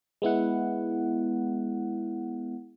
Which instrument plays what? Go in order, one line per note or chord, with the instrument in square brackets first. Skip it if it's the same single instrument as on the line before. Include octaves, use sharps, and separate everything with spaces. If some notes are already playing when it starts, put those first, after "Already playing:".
[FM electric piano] G#3 B3 E4 F#5